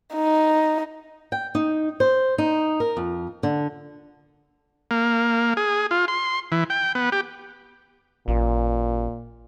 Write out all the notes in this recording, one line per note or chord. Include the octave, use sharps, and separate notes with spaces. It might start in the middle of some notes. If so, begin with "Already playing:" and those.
D#4
G5
D#4
C5
D#4
A#4
F2
D3
A#3
G#4
F4
C6
E3
G5
B3
G4
A1 A#2